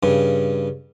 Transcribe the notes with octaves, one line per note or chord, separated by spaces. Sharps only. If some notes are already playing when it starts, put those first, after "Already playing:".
G2 C#3